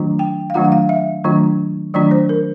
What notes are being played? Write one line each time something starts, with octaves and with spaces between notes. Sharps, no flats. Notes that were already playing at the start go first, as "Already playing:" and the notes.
Already playing: D#3 F#3 A3 D4 F4
G5
F5
D#3 F#3 A3 D4 F4 F#5
F#5
F5
E5
D#3 F#3 A3 D4 F4
D#3 F#3 A3 D4 F4 D5
C5
A#4